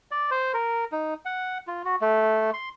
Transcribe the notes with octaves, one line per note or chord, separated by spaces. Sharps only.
D5
C5
A#4
D#4
F#5
F4
F#4
A3
C6